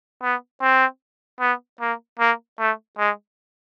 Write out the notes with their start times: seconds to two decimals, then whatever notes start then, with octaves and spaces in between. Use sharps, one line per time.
0.23 B3
0.62 C4
1.40 B3
1.81 A#3
2.20 A#3
2.59 A3
2.98 G#3